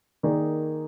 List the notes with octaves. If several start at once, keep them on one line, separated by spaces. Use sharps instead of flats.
D#3 A#3 D#4 G#4 D5